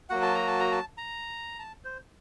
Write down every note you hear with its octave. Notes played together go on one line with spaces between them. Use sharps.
F#3 A#3 F#4 F#5
A5
A#5
A5
A#5
A5
A#5
A5
C5